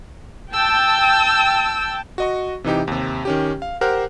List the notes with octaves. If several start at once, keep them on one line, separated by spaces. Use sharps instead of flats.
G5 A5 E6
F#4 D#5 C#6
C3 E3 D#4 G4
D#2 C3
D#3 C#4 G4
F5
G4 A#4 C5 F#5 F6 F#6